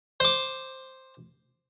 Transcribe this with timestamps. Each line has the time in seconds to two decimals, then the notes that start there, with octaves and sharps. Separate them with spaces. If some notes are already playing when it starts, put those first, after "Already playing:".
0.20 C5 D6